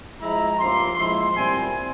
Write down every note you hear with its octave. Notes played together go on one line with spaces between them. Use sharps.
F3 G#3 E4 A#5
G2 F3 A#3 C#4 C6
F3 G#3 E4 C6
A#2 G3 C4 E4 G#5